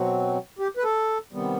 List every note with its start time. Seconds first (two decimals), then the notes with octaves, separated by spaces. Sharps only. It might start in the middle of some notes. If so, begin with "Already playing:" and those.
Already playing: B2 F#3 C4 F#4
0.59 G4
0.77 B4
0.84 A4
1.33 C3 D#3 G3 B3